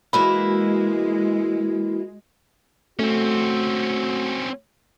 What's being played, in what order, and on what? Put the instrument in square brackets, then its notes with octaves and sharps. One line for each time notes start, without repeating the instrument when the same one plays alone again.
[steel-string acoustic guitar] E3 A#3 E4 [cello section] G#3 [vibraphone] F#4 [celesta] B5
[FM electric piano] A3 [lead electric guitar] C4 C#4 [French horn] F#4